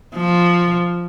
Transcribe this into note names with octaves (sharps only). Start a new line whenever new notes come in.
F3